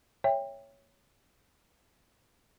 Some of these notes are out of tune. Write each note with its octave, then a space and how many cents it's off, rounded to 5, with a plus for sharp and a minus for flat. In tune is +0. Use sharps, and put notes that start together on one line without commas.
C#5 +0 E5 +0 G5 +25